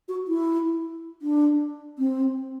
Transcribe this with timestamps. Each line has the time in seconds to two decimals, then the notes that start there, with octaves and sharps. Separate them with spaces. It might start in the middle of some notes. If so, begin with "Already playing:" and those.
0.08 F#4
0.28 E4
1.22 D4
1.99 C4